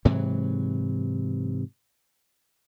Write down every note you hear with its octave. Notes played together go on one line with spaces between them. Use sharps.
G#2 C3 E3 F#3